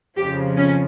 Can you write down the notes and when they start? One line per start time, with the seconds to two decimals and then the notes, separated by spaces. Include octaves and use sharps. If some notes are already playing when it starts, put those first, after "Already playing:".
0.17 F2 C#3 F3 G4
0.57 C#4